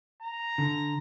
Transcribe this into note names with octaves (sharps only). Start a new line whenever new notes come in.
A#5
D3